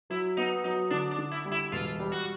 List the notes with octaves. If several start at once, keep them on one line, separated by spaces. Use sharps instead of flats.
F#3 E4
B3 D#4
F#3 D#4
D3 D4
D4
D3
E4
G3
E4
E1 F4
G3
F#4